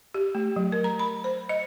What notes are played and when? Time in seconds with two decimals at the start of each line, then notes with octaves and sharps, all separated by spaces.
0.14 G4
0.35 A3
0.56 F#3
0.72 A#4
0.84 A#5
0.99 B5
1.24 C5
1.49 D#5